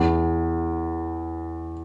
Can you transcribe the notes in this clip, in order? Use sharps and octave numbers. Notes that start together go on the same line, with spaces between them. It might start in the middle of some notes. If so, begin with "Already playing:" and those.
Already playing: E2